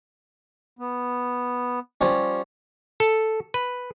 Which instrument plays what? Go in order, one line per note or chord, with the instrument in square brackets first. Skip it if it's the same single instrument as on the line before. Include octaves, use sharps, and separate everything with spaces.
[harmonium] B3
[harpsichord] F3 G3 C#4
[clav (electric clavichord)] A4
B4